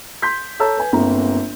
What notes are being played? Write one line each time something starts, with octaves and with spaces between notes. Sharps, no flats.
C6 G6 B6
A4 C#5 A5 A#5 E6
B4 G#5
G1 A#3 C4 A#5